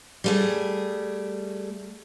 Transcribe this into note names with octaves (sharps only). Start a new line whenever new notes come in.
G3 A3 G#4